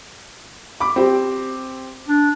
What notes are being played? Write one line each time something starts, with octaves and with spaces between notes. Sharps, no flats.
B5 D6
C4 G4
D4